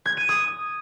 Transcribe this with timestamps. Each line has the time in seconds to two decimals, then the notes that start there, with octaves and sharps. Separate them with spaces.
0.06 G#6
0.17 D#7
0.29 D#6